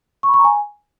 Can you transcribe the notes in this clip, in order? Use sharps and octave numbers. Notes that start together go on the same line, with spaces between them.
C#6
B5
C#6
A#5
G#5